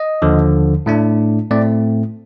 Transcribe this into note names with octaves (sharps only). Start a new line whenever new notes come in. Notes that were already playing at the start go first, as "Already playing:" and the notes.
Already playing: D#5
D#2 D3 F3
A2 A3 D4
A2 A3 C4 D5